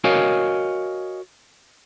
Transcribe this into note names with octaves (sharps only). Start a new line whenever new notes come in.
F#4 A#4 C#5 D#5 F5 G#5